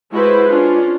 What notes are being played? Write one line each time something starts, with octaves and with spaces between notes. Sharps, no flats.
G#3 E4 F#4 B4 C5
C#4 D4 F4